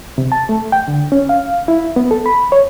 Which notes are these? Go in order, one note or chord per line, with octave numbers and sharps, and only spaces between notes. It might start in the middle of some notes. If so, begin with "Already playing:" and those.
C3
A5
A3
G5
D3
C#4
F5
E4
B3
A4
B5
C#5